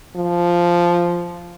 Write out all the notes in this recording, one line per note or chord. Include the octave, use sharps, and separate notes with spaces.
F3